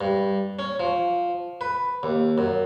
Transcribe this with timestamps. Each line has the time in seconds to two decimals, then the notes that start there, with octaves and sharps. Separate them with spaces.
0.01 G2
0.59 C#4
0.80 F3
1.61 B4
2.03 D#2
2.38 F#2